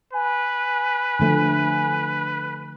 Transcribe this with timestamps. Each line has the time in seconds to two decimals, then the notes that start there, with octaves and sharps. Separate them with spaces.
0.14 B4 G#5
1.19 D3 F3 A3